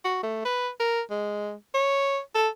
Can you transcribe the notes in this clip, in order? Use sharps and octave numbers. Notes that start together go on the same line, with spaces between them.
F#4
A3
B4
A#4
G#3
C#5
A4